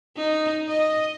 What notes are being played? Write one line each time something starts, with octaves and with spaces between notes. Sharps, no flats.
D#4
D#5